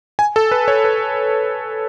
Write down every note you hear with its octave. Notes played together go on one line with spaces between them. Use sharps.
G#5
A4
B4
C#5
B4